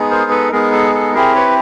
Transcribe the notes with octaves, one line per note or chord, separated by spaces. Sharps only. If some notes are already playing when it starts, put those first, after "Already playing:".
Already playing: G#3 B3 D#4 G#4
A#4 C5
A4 B4
G#3 B3 D#4 G#4 A#4
A4
A4
C4 E4 G4 G#4 A#4
B4 C#5